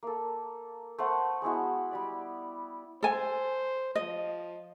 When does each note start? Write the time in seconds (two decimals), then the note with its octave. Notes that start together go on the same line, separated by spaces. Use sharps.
0.03 A#3 A4
0.98 A3 C5 F#5 A5
1.42 G#3 B3 E4 F#4
1.91 G3 G4 D5
3.03 A4 C5 G#5
3.95 F3 D#5